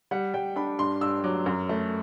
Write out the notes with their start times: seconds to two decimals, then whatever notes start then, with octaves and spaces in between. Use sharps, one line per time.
0.11 G3 F#5
0.34 G3 G5
0.56 D4 B5
0.78 G2 C6
1.01 G2 E6
1.24 F#3 D6
1.46 F#2
1.69 A3